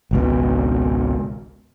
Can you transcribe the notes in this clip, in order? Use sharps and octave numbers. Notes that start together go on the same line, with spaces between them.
G#1 C#2 B2